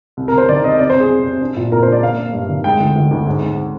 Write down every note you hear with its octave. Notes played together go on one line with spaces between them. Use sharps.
C2
A#4
C2
C5
D#3 D5
C2 D#5
C3 D5
C5
C3
G#4
F2
C3
D4
A#2
A#2 A#4
C5
D4
D5
A#3 F5
A#3
G2
D#3
G#3 G5
D2
D2
D2
G#2
G#2